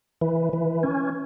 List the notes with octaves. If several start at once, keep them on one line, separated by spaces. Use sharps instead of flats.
E3
E3
C#4